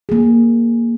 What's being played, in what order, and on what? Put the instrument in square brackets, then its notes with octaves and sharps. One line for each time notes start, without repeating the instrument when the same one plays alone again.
[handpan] A#3 G#4